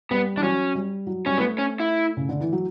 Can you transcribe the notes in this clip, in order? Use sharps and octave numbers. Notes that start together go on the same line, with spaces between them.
G3 B3
E3 D4
F#3 C#4
G3
F#3
G3 C#4
A3 B3
C#4
E4
C#3
D3
E3
F#3